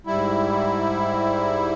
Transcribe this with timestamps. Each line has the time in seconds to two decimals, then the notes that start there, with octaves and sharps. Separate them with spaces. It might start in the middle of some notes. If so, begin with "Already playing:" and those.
0.07 G#2 G3 E4